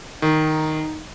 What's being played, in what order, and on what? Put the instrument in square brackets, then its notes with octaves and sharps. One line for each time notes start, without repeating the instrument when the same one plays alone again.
[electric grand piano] D#3 [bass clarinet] D#4